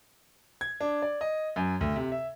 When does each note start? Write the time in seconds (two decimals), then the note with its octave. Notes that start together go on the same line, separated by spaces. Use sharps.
0.61 G#6
0.81 D4
1.02 D5
1.21 D#5
1.56 F#2
1.81 D2
1.96 C3
2.12 E5